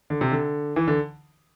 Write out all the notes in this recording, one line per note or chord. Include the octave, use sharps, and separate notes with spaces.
D3
C3
D3
E3
D3